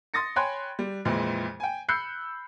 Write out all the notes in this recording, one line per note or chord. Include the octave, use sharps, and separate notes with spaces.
C6 D#6 A6 A#6 C#7
C#5 G5 G#5 B5 C6 F#6
G3
F2 A#2 E3 G#3
G5 G#5
B5 E6 F#6 G6 C7 C#7